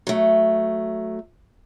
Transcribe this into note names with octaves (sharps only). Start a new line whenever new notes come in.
F#3 A3